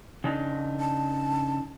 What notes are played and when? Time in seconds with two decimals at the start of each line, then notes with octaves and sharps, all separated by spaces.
0.24 C#3 D4 D#4
0.80 A5